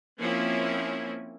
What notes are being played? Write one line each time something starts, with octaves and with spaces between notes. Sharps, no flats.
F3 A#3 C4 C#4 E4